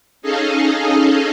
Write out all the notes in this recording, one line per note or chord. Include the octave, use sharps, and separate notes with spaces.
C#4 D#4 G#4 A4 D#5 F5